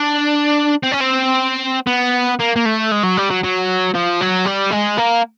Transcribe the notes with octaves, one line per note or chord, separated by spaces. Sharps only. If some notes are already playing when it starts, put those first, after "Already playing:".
Already playing: D4
C4
C#4
C4
B3
A#3
A#3
A3
G#3
F#3
G3
F#3
F#3
F3
F#3
G3
G#3
A#3